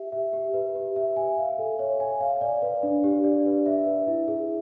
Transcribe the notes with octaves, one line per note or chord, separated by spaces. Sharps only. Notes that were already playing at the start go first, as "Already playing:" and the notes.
Already playing: G4 E5
E5
G4
B4
G4
E5
G#5
F5
A4
C#5
G#5
F5
D5
B4
D4
G4
D5
B4
E5
B4
E4
G#4